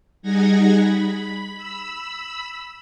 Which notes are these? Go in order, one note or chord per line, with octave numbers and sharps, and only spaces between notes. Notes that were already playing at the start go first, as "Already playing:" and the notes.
G3 D#4 G#4 F#5 G#6 A#6
B5
B5 E6